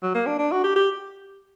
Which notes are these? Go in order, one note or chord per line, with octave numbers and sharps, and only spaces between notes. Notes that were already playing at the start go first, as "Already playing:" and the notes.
F#3
A#3
D4
D4
F#4
G4
G4